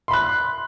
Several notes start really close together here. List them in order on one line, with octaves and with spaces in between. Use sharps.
C6 B5 F#6